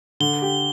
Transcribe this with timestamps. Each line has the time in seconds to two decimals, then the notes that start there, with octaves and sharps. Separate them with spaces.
0.20 D3 G7
0.42 G4